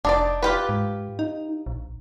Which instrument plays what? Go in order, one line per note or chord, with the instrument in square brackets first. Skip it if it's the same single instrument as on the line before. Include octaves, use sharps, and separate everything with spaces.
[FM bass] F1 [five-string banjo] D4 D#4 D5
[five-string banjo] F4 G4 B4
[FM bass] G#2
D#4
A#1